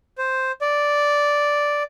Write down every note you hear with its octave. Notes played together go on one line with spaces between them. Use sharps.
C5
D5